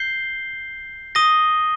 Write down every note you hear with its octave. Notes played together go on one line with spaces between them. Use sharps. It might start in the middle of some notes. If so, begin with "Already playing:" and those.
Already playing: G6 C7 G7
D#6 A#6 D#7 G7